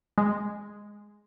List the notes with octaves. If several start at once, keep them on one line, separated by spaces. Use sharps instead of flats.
G#3